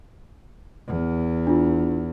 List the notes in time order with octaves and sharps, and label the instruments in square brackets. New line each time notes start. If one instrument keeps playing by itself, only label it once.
[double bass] E2
[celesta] D4 F4